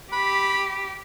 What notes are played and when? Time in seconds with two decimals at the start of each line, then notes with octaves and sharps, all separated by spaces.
0.13 G4 B5